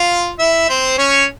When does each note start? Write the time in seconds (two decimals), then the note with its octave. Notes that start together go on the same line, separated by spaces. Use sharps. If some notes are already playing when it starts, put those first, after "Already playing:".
Already playing: F4 F5
0.39 E4 E5
0.68 C4 C5
0.98 C#4 C#5